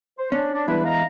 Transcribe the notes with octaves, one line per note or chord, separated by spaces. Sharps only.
C5
C#4 D4
D4
E2 G3 G#3 D4 E4 B4
D#5 F5 A#5